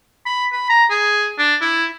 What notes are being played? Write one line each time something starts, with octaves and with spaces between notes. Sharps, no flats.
B5
B5
A#5
G#4
D4
E4